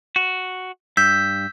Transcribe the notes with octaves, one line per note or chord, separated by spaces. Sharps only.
F#4
G2 E6 G6 B6